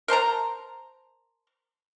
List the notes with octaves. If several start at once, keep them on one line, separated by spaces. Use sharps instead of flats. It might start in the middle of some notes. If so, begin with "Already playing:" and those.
A#4 C5 A5 A#5